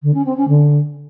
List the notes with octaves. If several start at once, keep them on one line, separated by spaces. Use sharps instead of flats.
D3
C#4
C4
C#4
D3